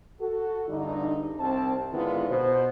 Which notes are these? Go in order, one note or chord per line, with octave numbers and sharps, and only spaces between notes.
F#4 A4
E2 G2 D3 D#4
C2 C4 A5
G#2 D3 D#3 B3 E4 F4
B2 C5